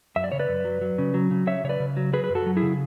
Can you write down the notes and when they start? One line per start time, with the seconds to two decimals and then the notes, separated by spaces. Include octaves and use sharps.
0.16 F#2 E5
0.24 D5
0.32 C#3 C#5
0.39 B4 D5
0.49 F#2
0.65 F#3
0.81 F#3
0.98 C#3
1.14 F#3
1.31 C#3
1.47 C#3 C#5 E5
1.64 C#3 C#5
1.69 B4 D5
1.80 C#3
1.97 F#3
2.13 F#3 G#4 B4
2.24 B4
2.29 F#2
2.35 F#4 A4
2.46 F#3
2.57 E4 G#4
2.63 C#3